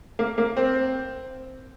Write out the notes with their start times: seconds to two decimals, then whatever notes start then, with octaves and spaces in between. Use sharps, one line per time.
0.19 A#3
0.38 A#3
0.57 C4